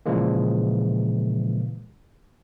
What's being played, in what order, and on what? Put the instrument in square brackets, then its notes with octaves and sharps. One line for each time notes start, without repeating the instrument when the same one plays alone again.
[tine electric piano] A#2 C#3 E3 F3 G#3 A#3